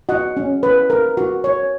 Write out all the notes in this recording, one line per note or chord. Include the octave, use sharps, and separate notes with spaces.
F#4 D#5 F#5
C#4
B4
A#4
F#4
C#5